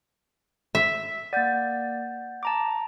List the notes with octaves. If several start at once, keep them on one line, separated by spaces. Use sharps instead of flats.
E5
A#3 D5 F#5 G6 A6
A5 A#5 D6